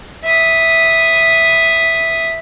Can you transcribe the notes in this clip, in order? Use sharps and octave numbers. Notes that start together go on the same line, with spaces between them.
E5 D#6